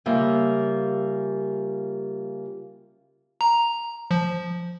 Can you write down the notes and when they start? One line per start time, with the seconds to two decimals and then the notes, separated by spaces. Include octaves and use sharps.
0.06 C#3 G3 A#3 F4 E5
3.41 A#5
4.11 F3